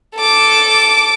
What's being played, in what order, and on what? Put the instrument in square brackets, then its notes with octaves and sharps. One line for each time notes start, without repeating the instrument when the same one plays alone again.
[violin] A4 D6